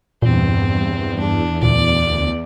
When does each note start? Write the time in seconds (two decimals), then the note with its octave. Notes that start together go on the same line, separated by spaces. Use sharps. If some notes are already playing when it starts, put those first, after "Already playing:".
0.22 E2 G2 A#2 C4
1.19 D4
1.62 D2 A#2 D5